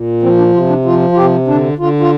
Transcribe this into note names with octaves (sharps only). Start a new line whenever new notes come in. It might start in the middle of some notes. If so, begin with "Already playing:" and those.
Already playing: A#2
F3 C4
D4
C3 F4
D4
F3 F4
F4
C3 G4
D3 D4
D3 F4
F4